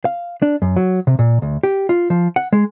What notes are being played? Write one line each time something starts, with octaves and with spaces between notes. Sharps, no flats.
F5
D4
F#2
F#3
C3
A#2
D2
G4
F4
F3
F#5
G#3